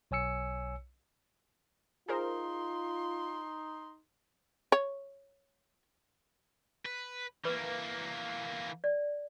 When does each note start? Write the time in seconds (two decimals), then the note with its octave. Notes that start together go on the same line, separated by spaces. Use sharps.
0.11 B1 C#5 G#5 E6 C#7
2.09 D#4 F4 G#4 A#4 C5 C6
4.72 C#5
6.85 B4
7.45 E3 A#3 B4
8.84 D5